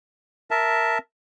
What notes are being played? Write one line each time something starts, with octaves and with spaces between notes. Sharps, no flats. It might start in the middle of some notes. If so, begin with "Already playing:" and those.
A#4 E5 A5